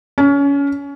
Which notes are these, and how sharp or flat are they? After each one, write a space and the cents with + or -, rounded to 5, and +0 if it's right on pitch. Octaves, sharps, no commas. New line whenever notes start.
C#4 +25